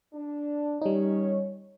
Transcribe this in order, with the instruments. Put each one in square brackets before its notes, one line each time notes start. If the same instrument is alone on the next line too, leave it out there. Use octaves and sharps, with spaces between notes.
[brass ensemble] D4
[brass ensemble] D#3 C#4 C#5 [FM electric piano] G3 D#4